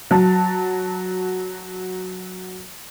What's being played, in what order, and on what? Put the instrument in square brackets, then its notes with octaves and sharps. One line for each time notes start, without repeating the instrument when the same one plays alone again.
[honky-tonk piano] F#3 A5 A6